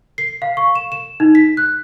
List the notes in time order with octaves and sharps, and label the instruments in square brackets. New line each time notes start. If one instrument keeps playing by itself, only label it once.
[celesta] C7
F5
C#6
E7
E7
D#4
B6
F#6